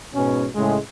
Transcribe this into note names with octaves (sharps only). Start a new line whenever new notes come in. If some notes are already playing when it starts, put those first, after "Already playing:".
G#2 B2 C#4
A2 C#3 G#3